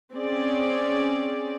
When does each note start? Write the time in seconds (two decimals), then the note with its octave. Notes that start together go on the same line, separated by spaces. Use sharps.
0.14 C4 C#4 G#4 D5